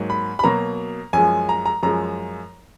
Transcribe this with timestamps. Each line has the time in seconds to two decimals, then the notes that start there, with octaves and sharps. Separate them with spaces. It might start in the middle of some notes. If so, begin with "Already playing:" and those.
Already playing: G#2 F#3 A#3
0.10 B5
0.39 B5
0.43 B2 F#3 A#3 A#5
1.13 F#2 F3 G#3 G#5
1.49 A#5
1.66 A#5
1.83 F#2 F3 G#3 A#5